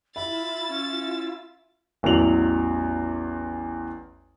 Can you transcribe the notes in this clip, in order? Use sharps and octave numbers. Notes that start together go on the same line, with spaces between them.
E4 F4 E5 B5 E6 A6
C#4
A1 E2 F#3 A4 F7 F#7